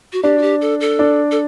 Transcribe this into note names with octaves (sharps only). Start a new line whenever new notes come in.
F#4
D4 G4 D5
F#4
G4
A4
A4
D4 D5
A4